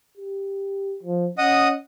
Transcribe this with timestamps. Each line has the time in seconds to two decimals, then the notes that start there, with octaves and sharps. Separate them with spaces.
0.17 G4
1.03 F3
1.38 C#4 D#5 F#5 D#6